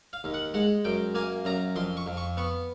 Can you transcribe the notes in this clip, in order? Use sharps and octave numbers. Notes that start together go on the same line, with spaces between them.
F5
D#2
F#5
G#3 F#5
F#2 G5
A#3 G#5
F#2 A#5
F2 C6
C#6
F2
C#6
B3 C#6